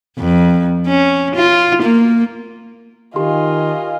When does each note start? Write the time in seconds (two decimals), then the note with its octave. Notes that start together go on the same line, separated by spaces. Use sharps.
0.19 F2
0.87 C#4
1.35 F4
1.82 A#3
3.16 D#3 F4 G4 D#5 G#5 C6